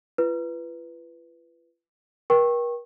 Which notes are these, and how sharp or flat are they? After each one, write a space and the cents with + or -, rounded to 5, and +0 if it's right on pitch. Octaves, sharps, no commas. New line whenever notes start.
F4 -40 B4 +0
A#4 +45 G5 +0 C#6 -25